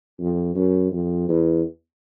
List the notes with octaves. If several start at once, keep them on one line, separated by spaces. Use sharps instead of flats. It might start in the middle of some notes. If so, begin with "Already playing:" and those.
F2
F#2
F2
E2